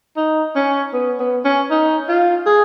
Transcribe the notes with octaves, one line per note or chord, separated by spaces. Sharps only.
D#4
C#4
B3
B3
C#4
D#4
F4
G#4